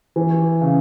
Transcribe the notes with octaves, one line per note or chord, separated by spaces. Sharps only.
E3
C#3